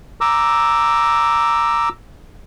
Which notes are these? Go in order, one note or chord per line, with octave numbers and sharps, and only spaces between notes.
A#5 D6 E6